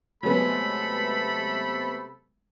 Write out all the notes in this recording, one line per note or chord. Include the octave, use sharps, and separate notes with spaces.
C3 F#3 G#3 A3 B3 A4 B5